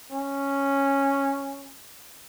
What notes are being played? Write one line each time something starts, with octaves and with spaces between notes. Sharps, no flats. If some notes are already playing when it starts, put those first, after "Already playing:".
C#4